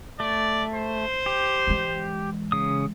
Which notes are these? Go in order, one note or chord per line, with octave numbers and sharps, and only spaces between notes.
A3 D5
C5
G4
E3 G#3
C#3 D#6